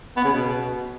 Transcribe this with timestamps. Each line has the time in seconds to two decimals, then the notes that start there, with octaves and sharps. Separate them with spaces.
0.17 B3
0.25 C#3
0.32 B2